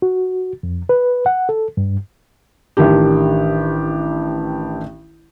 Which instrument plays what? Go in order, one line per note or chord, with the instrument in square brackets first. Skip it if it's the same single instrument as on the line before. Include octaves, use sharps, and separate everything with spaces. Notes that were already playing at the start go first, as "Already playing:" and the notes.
[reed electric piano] F#4
F2
B4
F#5
A4
G2
[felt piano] A1 D#3 D4 G4